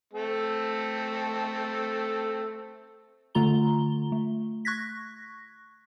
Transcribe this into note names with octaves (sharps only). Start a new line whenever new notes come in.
A3 C4 A4
D3 A3 F4 A#5 G7
A3
C#6 F#6 G#6 A#6 B6